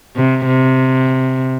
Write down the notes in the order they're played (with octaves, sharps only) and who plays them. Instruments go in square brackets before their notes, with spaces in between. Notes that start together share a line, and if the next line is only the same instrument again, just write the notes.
[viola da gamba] C3
C3